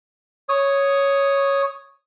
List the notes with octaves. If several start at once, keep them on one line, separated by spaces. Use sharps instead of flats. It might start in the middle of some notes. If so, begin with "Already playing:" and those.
C#5 D#6